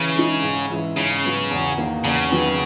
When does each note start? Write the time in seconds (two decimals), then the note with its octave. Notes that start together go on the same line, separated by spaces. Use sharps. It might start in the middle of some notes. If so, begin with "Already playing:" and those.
Already playing: C#3 E3
0.15 G#3 D#4
0.42 G#2
0.70 E3 G#3 C#4 E4
0.97 G#2 C#3
1.24 F#3 B3
1.51 E2
1.78 D#3 A#3
2.04 E2 C#3
2.31 D#3 F#3 B3